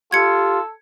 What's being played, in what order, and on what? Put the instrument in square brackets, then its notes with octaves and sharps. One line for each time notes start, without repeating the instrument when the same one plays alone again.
[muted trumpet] F4 [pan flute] G4 [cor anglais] A4 [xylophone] G#6 C#7